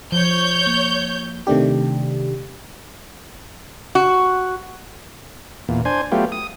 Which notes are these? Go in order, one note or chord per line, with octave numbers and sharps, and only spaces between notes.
F3 C#5 G6
A#3
C3 D#3 A3 D4 G4
F#4
E2 A#2
D4 C5 G#5
F#3 A3 B3 F4 G4
D#6